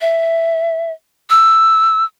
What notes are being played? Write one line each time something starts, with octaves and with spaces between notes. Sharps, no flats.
E5
E6